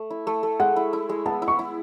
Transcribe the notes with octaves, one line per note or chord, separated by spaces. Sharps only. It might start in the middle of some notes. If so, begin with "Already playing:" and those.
Already playing: A3
E4
A3
A3
G#3 F#5
E4
E4
G#3
B3 A5
E4
C#6
E4